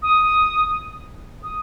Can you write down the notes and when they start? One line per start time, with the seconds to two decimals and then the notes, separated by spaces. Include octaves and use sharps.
0.02 D#6
1.43 D#6